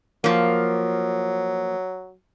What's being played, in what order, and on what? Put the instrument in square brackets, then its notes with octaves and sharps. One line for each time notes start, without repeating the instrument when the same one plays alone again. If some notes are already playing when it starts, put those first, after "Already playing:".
[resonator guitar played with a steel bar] F3 A#3 [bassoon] F#3